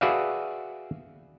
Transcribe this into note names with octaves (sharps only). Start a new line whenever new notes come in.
F#4 G#4 B4 D5 E5 F5